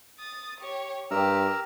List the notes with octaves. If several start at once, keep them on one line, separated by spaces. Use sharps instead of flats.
D#6 A6
G4 C#5
G2 G4 A#4 A#5 E6